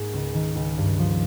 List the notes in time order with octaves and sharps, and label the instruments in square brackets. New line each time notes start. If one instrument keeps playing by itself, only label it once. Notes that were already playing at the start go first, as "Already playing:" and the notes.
Already playing: [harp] G#2 A#3 G#4 A#4
C#2
D#3
C#2
G2
F3